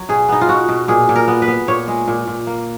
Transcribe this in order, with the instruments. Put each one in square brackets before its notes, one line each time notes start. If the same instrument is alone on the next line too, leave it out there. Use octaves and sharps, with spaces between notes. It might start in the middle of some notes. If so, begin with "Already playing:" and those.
Already playing: [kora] F#3
B2 G#4
B3 D#4
F4
B2 F#4
B2
A#2 G#4
A#2
A#4
B3
B4
B3
A#2 C#5
G#3
A#2
A#2
A#3